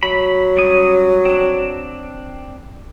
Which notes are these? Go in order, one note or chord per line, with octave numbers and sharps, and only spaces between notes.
F#3 B5
G3 C#4 D#6
C4 D4